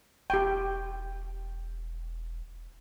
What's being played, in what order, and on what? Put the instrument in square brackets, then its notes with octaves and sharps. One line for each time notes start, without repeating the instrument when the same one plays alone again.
[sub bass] E1 [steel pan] G4 G5